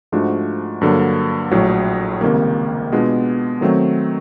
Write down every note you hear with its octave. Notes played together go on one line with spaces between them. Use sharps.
G#2 F3 A3 D4 F#4
G2 D3 F#3 A#3
A#1 A2 F#3
C#2 C3 D#3 G3 A#3
B2 G#3 B3 D4 F4
D#3 F#3 A3 C4